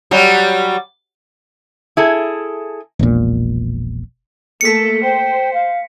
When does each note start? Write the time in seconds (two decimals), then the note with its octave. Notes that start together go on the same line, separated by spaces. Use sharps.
0.11 F#3 G3
1.97 E4 G#4 A4
2.99 E1 A#1 A#2
4.61 A3 A#3 A4 B6 C#7
5.03 C5 G5
5.54 F5